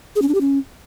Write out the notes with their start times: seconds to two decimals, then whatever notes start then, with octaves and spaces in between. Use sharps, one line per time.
0.16 G#4
0.22 C#4
0.28 D4
0.35 G4
0.41 C#4